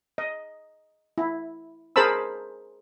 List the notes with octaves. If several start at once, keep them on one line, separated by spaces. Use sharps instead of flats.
D#5
E4
G#4 A#4 C5 A5 B5 E6